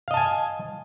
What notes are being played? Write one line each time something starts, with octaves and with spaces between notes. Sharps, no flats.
D#5 F5 G#5 A5